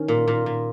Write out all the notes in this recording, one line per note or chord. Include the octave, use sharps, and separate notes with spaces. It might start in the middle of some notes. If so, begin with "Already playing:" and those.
Already playing: D#3 C#4
A#2
A#2
A#2